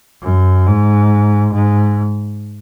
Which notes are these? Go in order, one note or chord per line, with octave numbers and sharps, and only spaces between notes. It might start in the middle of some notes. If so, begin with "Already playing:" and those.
F#2
G#2
G#2